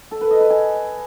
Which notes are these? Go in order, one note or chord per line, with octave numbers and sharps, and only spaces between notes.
A4
B4
D#5
B4
G#5